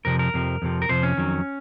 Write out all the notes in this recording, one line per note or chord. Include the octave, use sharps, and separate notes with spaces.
F2 C3 F3 A#4
A#4
F2 C3 F3
F2 C3 F3
A#4
F2 C3 F3 C5
C#4
F2 D#3 F#3